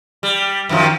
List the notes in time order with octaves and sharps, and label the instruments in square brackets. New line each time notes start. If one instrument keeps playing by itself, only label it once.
[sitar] G3
F#2 D#3 F3